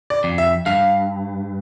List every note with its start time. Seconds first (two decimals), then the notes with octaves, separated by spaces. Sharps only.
0.10 D5
0.24 F2
0.38 E5
0.66 G2 F5